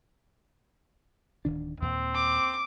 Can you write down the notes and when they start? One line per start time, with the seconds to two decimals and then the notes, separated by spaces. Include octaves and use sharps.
1.45 D1 D#3 D4
1.82 D#2 A#2 C4
2.15 D6